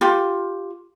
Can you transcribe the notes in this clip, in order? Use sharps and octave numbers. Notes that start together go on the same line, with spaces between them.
F4 G4